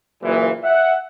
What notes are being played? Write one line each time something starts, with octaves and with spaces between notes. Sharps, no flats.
F#1 A#2 E3
E5 F#5